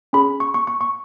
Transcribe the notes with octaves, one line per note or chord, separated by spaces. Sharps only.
C#4 G#4 B5
C#6
C#6
C#6
C#6